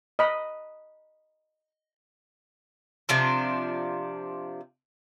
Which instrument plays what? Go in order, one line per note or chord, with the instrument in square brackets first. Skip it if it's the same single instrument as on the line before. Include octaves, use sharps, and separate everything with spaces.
[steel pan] D#5 B5
[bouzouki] C3 F3 D4